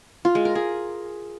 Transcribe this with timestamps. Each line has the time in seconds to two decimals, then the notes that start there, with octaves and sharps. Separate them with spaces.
0.25 F4
0.35 G#3
0.45 A#4
0.55 G#4